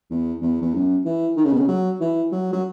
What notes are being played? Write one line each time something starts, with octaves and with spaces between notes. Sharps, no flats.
E2
E2
E2
F#2
E3
D#3
C#3
B2
C#3
F#3
E3
F#3
F#3